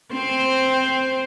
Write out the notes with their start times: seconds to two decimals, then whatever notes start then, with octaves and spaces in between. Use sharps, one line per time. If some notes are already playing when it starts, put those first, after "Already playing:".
0.13 C4 C5